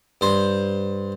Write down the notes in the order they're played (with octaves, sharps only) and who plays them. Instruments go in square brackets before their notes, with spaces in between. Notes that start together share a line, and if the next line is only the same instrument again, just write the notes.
[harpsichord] G2 C5